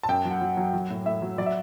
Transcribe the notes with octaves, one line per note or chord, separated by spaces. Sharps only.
A5
F#2 G5
F#3
F#5
F#3
F#3
F#3
A2
A2 E5
F#3
F#3 D5
E5